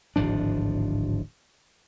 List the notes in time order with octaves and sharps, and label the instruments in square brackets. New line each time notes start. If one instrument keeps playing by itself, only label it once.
[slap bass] D1 G#1 F3 D4